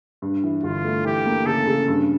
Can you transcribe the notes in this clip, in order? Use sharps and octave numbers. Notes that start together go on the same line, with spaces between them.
G2
E3
G1 F4
A3
E3 G4
A#3
C#3 A4
C#3
G2